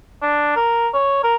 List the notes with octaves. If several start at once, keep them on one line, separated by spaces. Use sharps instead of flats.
D4
A#4
C#5
A#4